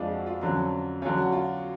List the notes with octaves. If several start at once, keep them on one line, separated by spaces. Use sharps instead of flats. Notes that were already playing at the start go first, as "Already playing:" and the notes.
Already playing: F2 F3 G#3 D4 F4
F#4
F4
F2 D3 F#3 C#4
D3 F#3 C#4 F4
F#4
F4